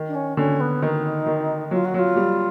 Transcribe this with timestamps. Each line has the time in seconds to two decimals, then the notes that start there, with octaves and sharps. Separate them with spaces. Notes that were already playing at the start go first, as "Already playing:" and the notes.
Already playing: D#3
0.08 D4
0.14 C#4
0.37 D3 C#4
0.60 B3
0.82 D#3 D#4
1.26 D#3
1.71 F#3 F4
1.85 F#4
1.94 F#3 F4
2.16 G3